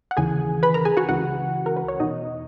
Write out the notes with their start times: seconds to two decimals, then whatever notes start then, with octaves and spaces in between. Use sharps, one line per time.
0.11 F#5
0.17 D#2 C#3 E3 G#4 G#5
0.63 B4 B5
0.74 A#4 A#5
0.85 G#4 G#5
0.97 F#4 F#5
1.09 C#2 C#3 E3 F#4 F#5
1.66 A#4
1.76 B4
1.88 C#5
2.00 E2 B2 D#4 D#5